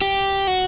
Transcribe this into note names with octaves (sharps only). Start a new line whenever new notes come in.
G4
F#4